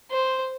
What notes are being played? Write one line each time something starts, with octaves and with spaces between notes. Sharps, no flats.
C5